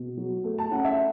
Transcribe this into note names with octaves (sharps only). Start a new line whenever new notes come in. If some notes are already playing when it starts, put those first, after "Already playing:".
Already playing: B2
F#3
A3
A5
C#4 F#5
E5